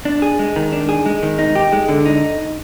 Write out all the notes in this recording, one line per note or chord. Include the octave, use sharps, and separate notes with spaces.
D4
G#4
G#3
D#3
D4
G#4
G#3
D#3
D#4
G4
G#3
D3
D#4